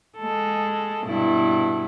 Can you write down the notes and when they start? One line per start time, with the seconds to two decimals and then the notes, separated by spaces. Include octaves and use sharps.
0.18 G#3 A4
1.06 G2 B2 E4